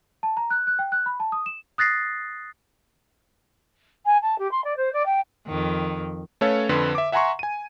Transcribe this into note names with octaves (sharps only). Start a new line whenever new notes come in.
A5
A#5
F#6
F#6
G5
F#6
B5
A5
D#6
E7
D#6 F#6 A6 A#6 C7
G#5
A5
G4
C6
D5
C5
D5
G5
F2 D#3
A3 C#4 A4 B4 C#5 F5
F2 D3 B4 C6
E5 D6
E5 F#5 G#5 A#5 C6 C#6
G#5 D#7